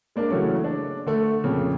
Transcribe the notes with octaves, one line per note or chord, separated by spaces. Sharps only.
G#3 A#3 D4
C#3 E3 F#3 A3 C#4
D4
D3 A3
F2 A#2 C#3